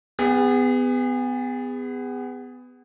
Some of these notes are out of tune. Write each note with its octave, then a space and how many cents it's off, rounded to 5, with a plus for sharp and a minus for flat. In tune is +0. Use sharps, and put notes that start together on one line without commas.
B3 +20 G#4 -35